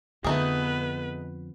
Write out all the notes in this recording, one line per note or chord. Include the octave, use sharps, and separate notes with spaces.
F2 D3 A3 B3 D#4 G#4 B4